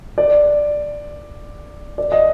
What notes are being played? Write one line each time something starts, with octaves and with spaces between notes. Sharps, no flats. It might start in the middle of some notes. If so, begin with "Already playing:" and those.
D5
D5
D#5